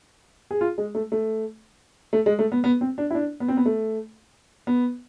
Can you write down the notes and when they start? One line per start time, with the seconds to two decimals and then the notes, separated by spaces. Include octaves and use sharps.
0.51 G#4
0.61 F4
0.78 G#3
0.95 A3
1.12 A3
2.13 A3
2.26 G#3
2.39 A3
2.52 B3
2.64 B3
2.81 C4
2.98 D4
3.11 E4
3.15 D4
3.40 B3
3.48 C4
3.57 B3
3.66 A3
4.67 B3